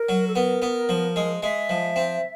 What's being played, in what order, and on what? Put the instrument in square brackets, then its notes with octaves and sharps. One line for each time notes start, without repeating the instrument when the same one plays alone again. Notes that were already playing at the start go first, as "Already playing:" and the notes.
Already playing: [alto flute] A#4
[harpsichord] F#3
[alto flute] A4
[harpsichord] B3 [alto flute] A#4
[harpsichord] B3
F3
G#3
[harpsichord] G#3 [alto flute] E5
[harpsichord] F3
C4